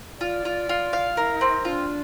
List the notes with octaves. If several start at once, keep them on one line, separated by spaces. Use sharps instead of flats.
F4 D5
F4
F4
F5
E4 A#4
C4
D4 F4